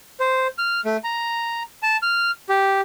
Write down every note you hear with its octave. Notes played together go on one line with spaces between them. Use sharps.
C5
F6
A3
A#5
A5
F6
G4